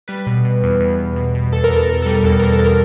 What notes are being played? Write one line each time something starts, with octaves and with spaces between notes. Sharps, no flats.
G3 B4
B2
B2
E2
E2
E2
B2
B2
E2 A4
A#4
E2
A4
E2 A#4
G3 A4
A#4
E2 A4
E2 A#4
A4
E2
A#4